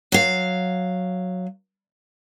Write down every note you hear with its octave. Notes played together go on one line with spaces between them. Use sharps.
F#3 F5